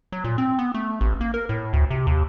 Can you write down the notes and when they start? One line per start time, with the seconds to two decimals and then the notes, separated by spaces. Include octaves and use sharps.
0.12 F#3
0.24 A#2
0.38 C4
0.59 B3
0.74 A3
1.01 A1
1.21 A#3
1.34 A#4
1.49 A2
1.73 D2
1.90 C3
2.07 D#2